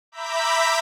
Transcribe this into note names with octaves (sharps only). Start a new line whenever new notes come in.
E5 A#5 B5 D6 G6 B6